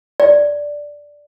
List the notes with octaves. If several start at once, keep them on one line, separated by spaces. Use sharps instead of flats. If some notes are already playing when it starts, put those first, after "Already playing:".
D5